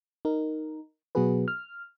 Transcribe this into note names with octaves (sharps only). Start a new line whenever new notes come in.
D#4 A#4
B2 F#3 B3 F#4 G#4 B4
F6